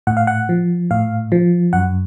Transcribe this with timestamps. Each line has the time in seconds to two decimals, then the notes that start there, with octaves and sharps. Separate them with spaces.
0.07 A2 F#5
0.17 F5
0.27 F#5
0.49 F3
0.91 A2 F5
1.32 F3
1.73 F#2 F#5